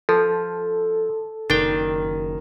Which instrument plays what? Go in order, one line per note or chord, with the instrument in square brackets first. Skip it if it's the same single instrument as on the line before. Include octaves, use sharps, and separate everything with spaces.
[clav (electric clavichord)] F3 [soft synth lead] A4
[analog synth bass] F#1 [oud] D#3 [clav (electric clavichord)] D4 G5